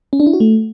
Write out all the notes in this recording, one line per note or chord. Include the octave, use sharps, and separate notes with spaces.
C#4
D4
E4
F#4
A3